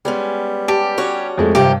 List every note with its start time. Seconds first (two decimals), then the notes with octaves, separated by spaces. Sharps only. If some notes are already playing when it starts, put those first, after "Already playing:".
0.05 G3 G#3 B3 C#4
0.68 G4 A5
0.98 C#4 F#4 C#5
1.38 F2 G#3 A3
1.55 G2 C3 D#3 F3 G4